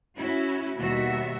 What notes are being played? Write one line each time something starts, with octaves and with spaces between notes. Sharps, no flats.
C#4 E4 F#4
D#2 B2 G3 F#4 E5